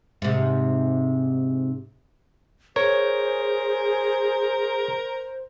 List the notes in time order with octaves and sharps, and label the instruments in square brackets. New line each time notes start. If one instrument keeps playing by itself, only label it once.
[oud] G#2 C3
[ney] G#4 [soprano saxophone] A#4 [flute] C5 [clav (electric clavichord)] C#5